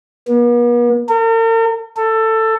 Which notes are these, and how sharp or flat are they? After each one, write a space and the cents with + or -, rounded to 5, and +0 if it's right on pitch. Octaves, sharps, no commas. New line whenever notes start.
B3 -45
A#4 -45
A4 +15